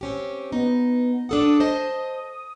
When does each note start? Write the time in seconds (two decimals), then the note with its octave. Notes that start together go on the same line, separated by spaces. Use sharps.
0.01 C4 C#4 G4
0.52 B3 D#4
1.29 D4 A4 F#5 D#6
1.60 C5 D#5 A5